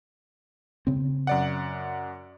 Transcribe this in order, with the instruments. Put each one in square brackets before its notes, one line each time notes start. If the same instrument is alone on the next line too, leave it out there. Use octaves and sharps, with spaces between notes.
[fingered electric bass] C#3 C4
[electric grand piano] F#2 D5 F#5